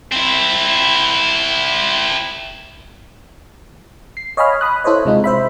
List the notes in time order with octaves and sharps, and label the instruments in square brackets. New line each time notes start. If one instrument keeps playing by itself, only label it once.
[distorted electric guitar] C4 E4
[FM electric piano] C7
C#5 D#5 F5 G#5 B5 F6
B5 D#6 F#6
E4 A4 C5 C#5 D#5
C3 G#3 D#4 F4
C5 E5 B5